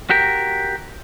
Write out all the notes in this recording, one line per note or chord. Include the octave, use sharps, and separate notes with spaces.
F#4 G4 A#4